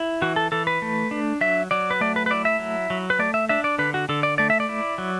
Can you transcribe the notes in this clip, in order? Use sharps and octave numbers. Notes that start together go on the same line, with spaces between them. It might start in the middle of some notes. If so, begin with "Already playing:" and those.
Already playing: E4
E3 F#4
A4
E3 A4
B4
A3
D4
F#3 E5
F#3 D5
B4
A3 D5
B4
B4
E4 D5
E5
F#3
F#3
B4
A3 D5
E5
D4 E5
D5
D3 B4
F#4
D3 A4
D5
A3 D5
E5
D5
E4
F#3